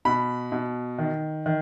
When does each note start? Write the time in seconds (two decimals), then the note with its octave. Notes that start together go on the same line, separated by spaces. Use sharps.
0.05 B2 B5
0.52 B2
0.99 D#3
1.46 D#3